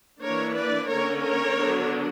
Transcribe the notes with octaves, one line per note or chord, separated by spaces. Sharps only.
E3 A#3 D4 A#4 C#5
B4 D5
D3 A#3 C#4 A#4 C#5
A#4 C#5
D3 F#3 B3 D4